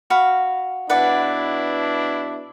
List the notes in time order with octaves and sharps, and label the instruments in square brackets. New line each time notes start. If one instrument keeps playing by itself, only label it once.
[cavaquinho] F#4 F5 B5
[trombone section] B2 D4 E4 [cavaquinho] B4 D5 F#5